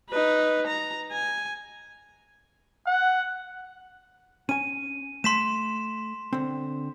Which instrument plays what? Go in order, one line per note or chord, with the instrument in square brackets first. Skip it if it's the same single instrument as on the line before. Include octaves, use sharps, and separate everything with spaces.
[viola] D#4 B4
A#5
G#5
[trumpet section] F#5
[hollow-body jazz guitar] C#4 G#5 [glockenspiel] D#7
[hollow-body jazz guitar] A3 [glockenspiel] C6 B6 E7
[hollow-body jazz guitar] D3 C4